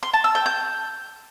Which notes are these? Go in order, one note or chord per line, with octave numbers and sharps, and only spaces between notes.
C6
A5
E6
G5
G6